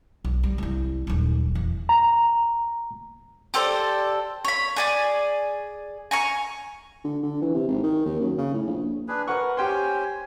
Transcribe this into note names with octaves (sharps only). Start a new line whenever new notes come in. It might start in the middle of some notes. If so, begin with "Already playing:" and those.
B1
G3
C2 E4
D#1 F#2
E2
A#5
G4 A4 C5 D5
C#5 B5
G#4 D5 G#5
G#5 A#5 C#6
D3
D3
E3
C3
G#1
D#3
D#2
F#2
C#3
A2
A#1
D4 G#4 B4
A#4 B4 F#5 C#6
C#4 G4 C5 G5 G#5 C6